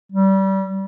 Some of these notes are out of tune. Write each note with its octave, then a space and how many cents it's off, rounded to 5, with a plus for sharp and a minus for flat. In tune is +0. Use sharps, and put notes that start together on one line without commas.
G3 -25